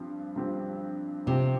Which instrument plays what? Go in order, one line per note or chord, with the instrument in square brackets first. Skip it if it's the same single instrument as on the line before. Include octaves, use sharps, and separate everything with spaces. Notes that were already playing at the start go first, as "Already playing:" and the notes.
Already playing: [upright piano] G2 F3 C4
G2 F3 C4 G4
[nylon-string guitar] C3 [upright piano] F3 C4 G4